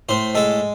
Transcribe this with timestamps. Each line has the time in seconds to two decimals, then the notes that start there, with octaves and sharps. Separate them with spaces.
0.09 A2 C5
0.35 G#3 A4